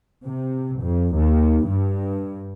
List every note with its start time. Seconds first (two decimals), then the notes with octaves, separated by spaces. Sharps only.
0.25 C3
0.81 F2
1.15 D#2
1.65 G2